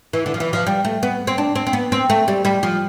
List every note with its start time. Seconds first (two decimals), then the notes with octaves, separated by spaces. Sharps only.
0.13 E3
0.26 D3
0.34 F3
0.40 E3
0.53 F3
0.67 G3
0.85 A3
1.03 B3
1.27 C4
1.38 D4
1.56 C4
1.67 C4
1.73 B3
1.92 C4
2.10 A3
2.28 G3
2.45 G3
2.63 F3